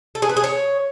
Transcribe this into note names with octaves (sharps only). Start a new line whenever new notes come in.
A4
G#4
B4
G#4
C#5